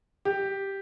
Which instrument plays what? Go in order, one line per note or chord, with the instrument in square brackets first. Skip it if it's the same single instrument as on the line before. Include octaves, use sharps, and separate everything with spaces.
[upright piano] G4